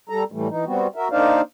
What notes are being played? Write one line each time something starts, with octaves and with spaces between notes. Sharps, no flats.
G3 A4 A#5
A2 E3 G3 A3
E3 D#4
G3 B3 C4 F#4
F#4 A#4 E5
A#3 D4 D#4 C5 D5 F5